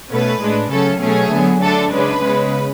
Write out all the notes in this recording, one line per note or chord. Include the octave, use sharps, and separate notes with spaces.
B2 A3 C#4 B4
A2 G#3 D4
C#3 F#3 A3 C#4 A4
B2 F#3 A3 C#4 G#4
D3 F#3 B3
D3 A3 D4 A4
C#3 G#3 D4 B4
C#3 G#3 B3